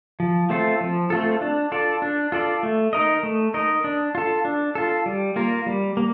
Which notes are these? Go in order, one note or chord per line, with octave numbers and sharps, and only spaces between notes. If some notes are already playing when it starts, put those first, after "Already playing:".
F3
A3 C4 F4 A4
F3
A3 C4 F4 A4
D4
F4 A4 D5
D4
F4 A4 D5
A3
D#4 A#4 D#5
A3
D#4 A#4 D#5
D4
F4 A4
D4
F4 A4
G3
A#3 F4 A#4
G3
A#3